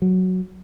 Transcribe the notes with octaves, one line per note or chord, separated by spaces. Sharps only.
F#3